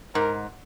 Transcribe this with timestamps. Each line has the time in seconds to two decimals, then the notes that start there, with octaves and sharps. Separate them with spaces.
0.14 G#2 A#4